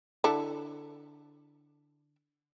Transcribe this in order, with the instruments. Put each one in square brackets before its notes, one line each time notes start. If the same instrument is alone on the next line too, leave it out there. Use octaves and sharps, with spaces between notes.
[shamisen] D3 E4 A4